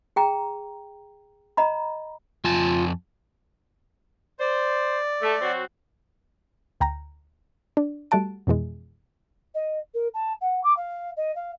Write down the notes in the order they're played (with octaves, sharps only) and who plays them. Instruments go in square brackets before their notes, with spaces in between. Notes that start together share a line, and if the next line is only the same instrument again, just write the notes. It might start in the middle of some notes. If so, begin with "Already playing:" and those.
[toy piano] G#4 G5 A#5
D#5 A#5 B5
[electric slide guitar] F2 G#5 A5 [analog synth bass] F4
[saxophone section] C5 [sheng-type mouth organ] D5
[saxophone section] A3
F#3 C4 F#4
[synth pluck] D2 G5 A#5 A#6
D4
G3 A3 F#4 F#5 A5 D7
F2 B2 E3 G#3
[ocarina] D#5
A#4
A5
F#5
D6
F5
D#5
F5